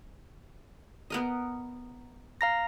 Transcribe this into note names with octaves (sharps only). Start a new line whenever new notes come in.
B3 A#4 D#5
F5 A#5 A#6